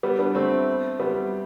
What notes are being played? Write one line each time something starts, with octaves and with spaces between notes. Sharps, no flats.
G3 B3
B3 D4
A3 C4
G3 B3